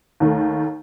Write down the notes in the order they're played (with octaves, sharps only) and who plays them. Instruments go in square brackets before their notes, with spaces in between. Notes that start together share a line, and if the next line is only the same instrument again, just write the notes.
[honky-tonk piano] D#2 D#3 A3